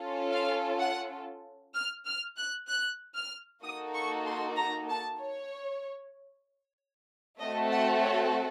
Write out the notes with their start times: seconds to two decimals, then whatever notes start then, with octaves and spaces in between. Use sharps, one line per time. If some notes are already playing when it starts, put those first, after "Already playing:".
Already playing: C#4 F4 A4
0.32 F5
0.80 F#5
1.75 F6
2.05 F6
2.37 F#6
2.68 F#6
3.15 F6
3.63 A#3 D#4 F#4 A4 D#6
3.94 C#6
4.25 C6
4.57 A#5
4.89 A5
5.20 C#5
7.39 A3 C4 F#4 A4 D#5
7.72 F#5
8.03 C#5